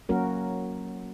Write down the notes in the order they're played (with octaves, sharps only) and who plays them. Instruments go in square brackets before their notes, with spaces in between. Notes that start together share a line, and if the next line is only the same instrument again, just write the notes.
[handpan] F#3 A#3 C#4 F#4 A#4